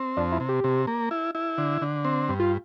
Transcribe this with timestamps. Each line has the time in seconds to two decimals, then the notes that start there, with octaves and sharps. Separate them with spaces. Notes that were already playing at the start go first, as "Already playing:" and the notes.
Already playing: C4
0.17 F2 D4
0.32 E4
0.40 C3
0.49 G4
0.64 C3
0.87 A#3
1.11 E4
1.35 E4
1.58 D3
1.82 D3
2.05 C4
2.28 G2
2.40 F4